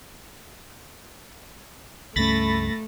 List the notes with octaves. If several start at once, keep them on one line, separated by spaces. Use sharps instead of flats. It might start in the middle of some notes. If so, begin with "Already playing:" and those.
C#2 G2 A3 C#4 B5 A6 A#6